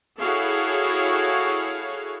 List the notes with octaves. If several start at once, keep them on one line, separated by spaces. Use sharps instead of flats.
E4 F#4 G#4 A4 C#5 F5